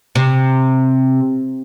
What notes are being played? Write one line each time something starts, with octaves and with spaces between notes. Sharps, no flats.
C3